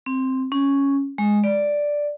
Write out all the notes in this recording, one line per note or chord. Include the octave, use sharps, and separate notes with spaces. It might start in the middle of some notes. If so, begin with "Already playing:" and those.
C4
C#4
G#3
D5